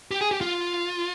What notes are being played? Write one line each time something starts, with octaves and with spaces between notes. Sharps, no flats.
G4
G#4
G4
F4